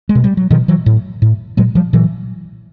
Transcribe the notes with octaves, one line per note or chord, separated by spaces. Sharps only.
G#3
B2
G3
F#3
B2 D#3 F3
E3 F#3
A2
A2
A#2 F#3 G#3
F3 G3
A#2 E3 F#3